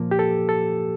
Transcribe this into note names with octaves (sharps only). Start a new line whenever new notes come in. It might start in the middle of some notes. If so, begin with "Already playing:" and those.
Already playing: A#2 F3 A#3
G4
A4
A4